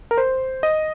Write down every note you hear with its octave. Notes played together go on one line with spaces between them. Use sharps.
A#4
C5
D#5